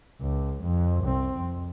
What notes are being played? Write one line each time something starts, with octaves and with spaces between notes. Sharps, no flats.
C#2
F2
C2 C4
F2